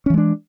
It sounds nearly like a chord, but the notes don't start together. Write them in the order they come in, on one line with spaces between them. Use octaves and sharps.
C#4 E3 G#3 D4